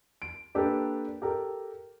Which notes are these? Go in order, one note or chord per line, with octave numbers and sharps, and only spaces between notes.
D7
A#3 D4 G4 A4 B4
G4 A4 A#4